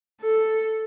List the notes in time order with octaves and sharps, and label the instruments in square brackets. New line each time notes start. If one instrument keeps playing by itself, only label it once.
[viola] A4